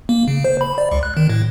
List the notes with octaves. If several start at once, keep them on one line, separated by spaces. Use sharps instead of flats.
A#3
C#3
C5
B5
D5
C#2
F#6
D#3
A2